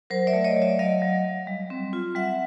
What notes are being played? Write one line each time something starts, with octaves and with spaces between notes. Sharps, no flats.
F#3 A#4 C5
D5 E5
A3
C#5 D#5
F#3
D5 E5
F#3 D#5 F5
F#3
F#3
G3
C4
F4
G3 E5 F#5